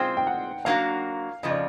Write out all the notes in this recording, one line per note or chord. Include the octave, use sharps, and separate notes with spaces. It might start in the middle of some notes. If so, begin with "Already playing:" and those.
Already playing: G#3 C4 F4 G#4 C5 G5
G5
F#5
F#3 A#3 D4 F#4 F5
F2 C#3 F3 D#5
D5